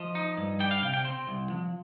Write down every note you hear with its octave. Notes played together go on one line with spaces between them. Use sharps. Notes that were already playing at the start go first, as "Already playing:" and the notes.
Already playing: F3 D#5
D#4
G2
G3 G5
F5
C3 G5
G5
C4 C6
C2
F3